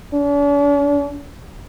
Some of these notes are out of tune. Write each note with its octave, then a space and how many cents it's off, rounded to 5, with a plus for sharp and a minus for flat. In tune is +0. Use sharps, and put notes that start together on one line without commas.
D4 -45